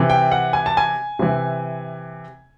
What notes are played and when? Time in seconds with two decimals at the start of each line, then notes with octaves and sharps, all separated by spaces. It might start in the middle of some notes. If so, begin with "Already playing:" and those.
Already playing: C3 E3
0.10 G5
0.32 F#5
0.53 G#5
0.66 A5
0.77 G#5
1.19 C3 E3